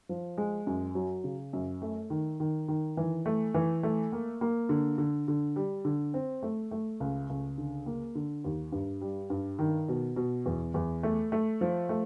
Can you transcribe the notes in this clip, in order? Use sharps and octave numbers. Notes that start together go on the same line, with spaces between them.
F3
G#3
F#2
F#3
C#3
F#2
A3
D#3
D#3
D#3
E3
A3
E3
A3
A#3
A#3
D3
D3
D3
G3
D3
C4
A3
A3
C#2
C#2
D3
A#3
D3
D#2
G2
G3
G2
D#3
B2
B2
E2
E2
A3
A3
F3
A3